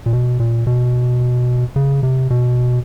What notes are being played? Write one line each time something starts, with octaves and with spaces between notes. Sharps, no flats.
A#2
B2
A#2
B2
C#3
C3
B2